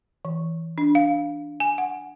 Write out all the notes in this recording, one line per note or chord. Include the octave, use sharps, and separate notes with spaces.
E3
D4
F5
G#5
F#5